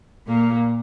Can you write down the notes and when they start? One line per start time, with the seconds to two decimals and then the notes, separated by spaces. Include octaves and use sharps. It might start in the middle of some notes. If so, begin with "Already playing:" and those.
0.28 A#2 A#3